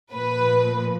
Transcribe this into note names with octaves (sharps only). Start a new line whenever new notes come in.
A#2 F3 B4